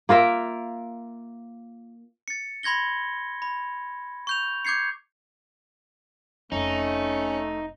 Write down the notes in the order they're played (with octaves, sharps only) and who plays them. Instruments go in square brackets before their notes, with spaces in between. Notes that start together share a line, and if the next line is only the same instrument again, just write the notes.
[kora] A#3 F4 A#4 E5
[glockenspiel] A6 C#7
B5 C6 G#6 A#6 G7
B5
C#6 G6 F7
D6 G6 G#6 C7 C#7
[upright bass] F1 [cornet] A3 [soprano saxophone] C#4 [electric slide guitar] D#4